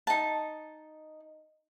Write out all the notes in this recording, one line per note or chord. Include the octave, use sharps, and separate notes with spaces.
D#4 A5